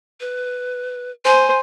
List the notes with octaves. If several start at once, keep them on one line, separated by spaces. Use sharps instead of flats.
B4
C5 G#5